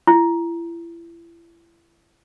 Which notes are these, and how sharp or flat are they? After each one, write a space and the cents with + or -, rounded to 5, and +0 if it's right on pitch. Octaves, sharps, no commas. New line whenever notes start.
E4 +35